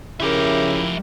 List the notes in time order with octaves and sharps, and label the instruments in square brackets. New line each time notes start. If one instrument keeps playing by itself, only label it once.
[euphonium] C#3 [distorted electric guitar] F3 E5 [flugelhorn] E4 [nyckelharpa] G4 A#4